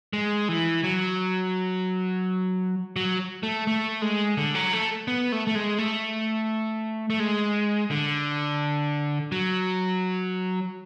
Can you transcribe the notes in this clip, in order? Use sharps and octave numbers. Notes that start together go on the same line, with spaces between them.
G#3
E3
F#3
F#3
A3
A3
G#3
D3
F#3
A3
B3
A3
A3
G#3
A3
A3
G#3
D3
F#3